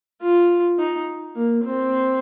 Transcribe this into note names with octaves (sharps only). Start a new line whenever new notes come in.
F4
D#4
A#3
C4